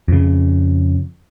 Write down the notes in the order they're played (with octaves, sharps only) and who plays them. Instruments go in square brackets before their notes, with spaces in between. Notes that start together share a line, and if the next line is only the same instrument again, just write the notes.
[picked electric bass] F2 C#3